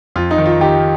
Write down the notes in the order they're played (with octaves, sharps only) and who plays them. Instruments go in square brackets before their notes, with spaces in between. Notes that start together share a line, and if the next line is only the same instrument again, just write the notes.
[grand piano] F2 F4
D#4
D#3
F4
D#3 G4